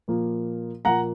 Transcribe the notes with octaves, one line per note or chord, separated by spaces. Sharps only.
A#2 F3 A#3
A#2 F3 A#3 F#5 A#5